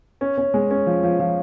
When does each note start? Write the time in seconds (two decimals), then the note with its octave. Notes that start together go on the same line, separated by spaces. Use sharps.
0.21 C#4
0.37 C#4
0.54 G#3
0.71 C#4
0.87 F3
1.03 F3
1.20 F3